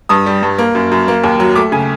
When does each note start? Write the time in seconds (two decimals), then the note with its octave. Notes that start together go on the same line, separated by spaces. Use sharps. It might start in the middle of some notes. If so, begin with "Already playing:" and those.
0.09 G2 D#6
0.26 G3
0.43 G2
0.58 A#3
0.75 F#2
0.92 F#2
1.08 A#3
1.24 D#2
1.40 F#3
1.56 A3 D6
1.72 C#3 G#5